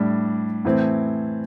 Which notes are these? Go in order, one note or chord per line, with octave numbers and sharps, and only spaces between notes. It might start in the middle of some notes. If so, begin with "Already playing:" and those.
Already playing: A2 G3 D4
A2 E3 C4